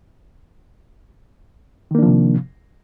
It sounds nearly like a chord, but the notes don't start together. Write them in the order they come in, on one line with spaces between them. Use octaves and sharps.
D#3 A#3 D4 F3 C3